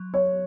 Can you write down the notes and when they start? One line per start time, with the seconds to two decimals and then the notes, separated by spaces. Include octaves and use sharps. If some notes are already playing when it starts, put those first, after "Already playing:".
Already playing: F#3
0.14 C#5